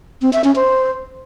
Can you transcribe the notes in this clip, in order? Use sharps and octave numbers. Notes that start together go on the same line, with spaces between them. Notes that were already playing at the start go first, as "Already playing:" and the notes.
C4
E5
C#4
C5